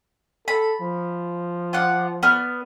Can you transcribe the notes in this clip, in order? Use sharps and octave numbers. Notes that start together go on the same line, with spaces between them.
A4 B5
F3
F4 D5 F#5
B3 D5 F6